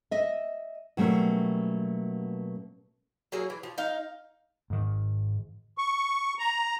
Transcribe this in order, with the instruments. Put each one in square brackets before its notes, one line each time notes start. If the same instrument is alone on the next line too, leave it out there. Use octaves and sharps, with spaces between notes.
[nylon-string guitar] D#5 E5
B2 F#3 G3 A3 A#3 C#4
[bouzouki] F#3 A#3 E4 G#4
E3
F3
D#4 F5
[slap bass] G#2 D#3
[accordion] C#6
A#5